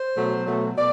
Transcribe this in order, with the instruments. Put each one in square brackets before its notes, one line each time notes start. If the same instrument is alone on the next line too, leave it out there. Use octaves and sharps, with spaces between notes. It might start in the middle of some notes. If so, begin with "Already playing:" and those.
Already playing: [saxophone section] C5
B2 F#3 A3
B2 F#3 A3
B2 D5